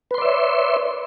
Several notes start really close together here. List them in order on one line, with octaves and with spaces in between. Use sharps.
B4 C6 D5 E5 C#5